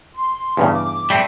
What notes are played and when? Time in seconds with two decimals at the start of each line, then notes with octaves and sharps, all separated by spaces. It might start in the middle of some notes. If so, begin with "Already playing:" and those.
0.15 C6
0.57 E2 G2 C#3
0.72 D6
1.10 G3 A3 C4